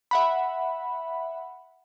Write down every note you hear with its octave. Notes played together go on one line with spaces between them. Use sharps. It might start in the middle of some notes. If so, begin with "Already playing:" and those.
E5 F#5 B5